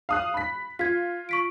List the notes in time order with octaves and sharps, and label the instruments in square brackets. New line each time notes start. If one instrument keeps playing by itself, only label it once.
[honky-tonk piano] F5 D#6 F#6
B5 B6
[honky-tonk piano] F4 [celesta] G#6 B6
[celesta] C#6 B6 D7